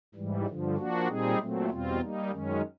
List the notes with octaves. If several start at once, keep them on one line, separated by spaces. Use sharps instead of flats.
G#2 E3 G3
G2 D3 F3
F3 A#3 D4 F#4
A#2 G3 C4 D#4 G#4
A#2 F#3 A3 C4
E2 B2 G3 C4 F4
G3 A#3 D#4
F#2 D#3 G#3 C#4